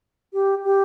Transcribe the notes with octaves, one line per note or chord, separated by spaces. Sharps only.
G4
G4